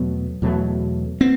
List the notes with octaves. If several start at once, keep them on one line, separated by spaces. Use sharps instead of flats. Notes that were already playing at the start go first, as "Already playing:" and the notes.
Already playing: E2 B2 F#3 A3 B3
E2 B2 F#3 A3
B3 C4